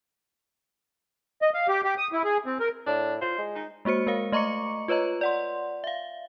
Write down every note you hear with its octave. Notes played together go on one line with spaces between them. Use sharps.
D#5
F5
G4
G4
D#6
E4
G#4
C4
A#4
A2 D4
F4 C5
G#3
D#4
G#3 A#3 F#4 C5 C#7
G#3 A#4 F5
A3 D#5 A#5 C#6 D6 C#7
F4 B4 C#5 D#5 A#5
D5 F#5 C6
E5 F5